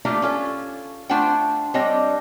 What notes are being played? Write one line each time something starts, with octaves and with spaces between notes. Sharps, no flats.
A3 A#3 D4 E4 F4 G4
C#4 F4 A4
A3 D4 F4 C5 F#5 G5
G3 C4 D4 C#5 D#5 G5